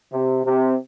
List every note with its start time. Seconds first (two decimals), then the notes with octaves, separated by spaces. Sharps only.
0.11 C3
0.45 C3